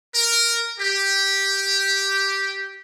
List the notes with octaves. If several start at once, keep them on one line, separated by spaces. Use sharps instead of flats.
A#4
G4